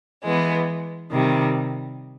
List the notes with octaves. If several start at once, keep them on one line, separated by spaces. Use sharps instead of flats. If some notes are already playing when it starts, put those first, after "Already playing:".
E3 G#3 B3
C3 D#3 G3